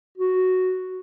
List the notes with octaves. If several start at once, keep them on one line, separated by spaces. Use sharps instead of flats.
F#4